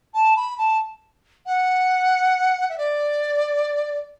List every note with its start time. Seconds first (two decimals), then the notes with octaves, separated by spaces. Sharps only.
0.14 A5
0.36 B5
0.58 A5
1.46 F#5
2.69 E5
2.78 D5